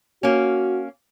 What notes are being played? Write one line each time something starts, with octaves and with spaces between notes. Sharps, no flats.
A#3 C#4 F#4